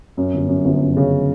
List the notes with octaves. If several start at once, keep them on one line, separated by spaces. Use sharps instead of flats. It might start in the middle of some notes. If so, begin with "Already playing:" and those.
F#2
G1
F#2
G1
F#2
C#3